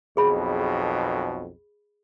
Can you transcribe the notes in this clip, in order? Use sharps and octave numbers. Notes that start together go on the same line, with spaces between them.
B1 F2 B2 G#4 B5